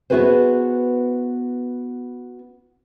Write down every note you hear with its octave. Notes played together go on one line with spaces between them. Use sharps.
B3 E4 F#4 G#4 B4 C5